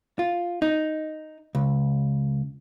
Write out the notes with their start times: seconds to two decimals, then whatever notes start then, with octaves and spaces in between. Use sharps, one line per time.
0.19 F4
0.62 D#4
1.55 C#2